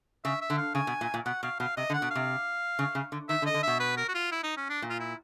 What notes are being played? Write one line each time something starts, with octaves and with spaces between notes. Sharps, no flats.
C#3 E5
E5
D3
F5
C#3 G#5
B2
A#2
A#2
B2 F#5
B2 F5
B2 F5
C3 D#5
D3
F#5
B2
C3 F5
C#3
C#3
D3
D#3 E5
D3
D#5
D3
B2 E5
B4
A#4
F#4
F4
E4
D#4
C#4
D4
A#2
F4
E4